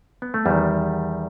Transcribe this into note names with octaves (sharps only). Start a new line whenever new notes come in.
B3
A3
E2 D#3 G3